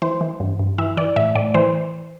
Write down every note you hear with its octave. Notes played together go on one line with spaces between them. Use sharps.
E3 C5
E3
G2
G2
E3 E5
E3 D5
A2 E5
A2 D5
E3 C5